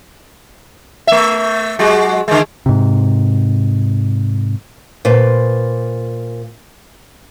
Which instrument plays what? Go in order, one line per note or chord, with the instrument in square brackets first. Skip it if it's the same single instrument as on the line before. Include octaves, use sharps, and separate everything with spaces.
[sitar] A3 E5
F#3 G#3 F#4
D3 G#3
[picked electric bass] G#2 C3
[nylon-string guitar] A#2 B4 C5